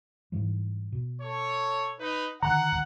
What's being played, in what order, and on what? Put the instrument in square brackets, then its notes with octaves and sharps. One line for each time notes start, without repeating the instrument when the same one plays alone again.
[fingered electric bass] G#2 E3 G3
B2
[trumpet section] A4 C#5
D#4 B4
[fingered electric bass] D3 D#3 [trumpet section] F#5 [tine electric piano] A#5